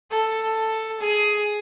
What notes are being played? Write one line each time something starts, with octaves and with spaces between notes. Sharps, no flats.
A4
G#4